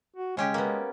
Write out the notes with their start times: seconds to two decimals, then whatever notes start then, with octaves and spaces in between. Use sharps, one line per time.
0.16 F#4
0.37 C#3 G#3 C#4 G4
0.54 A#3 B3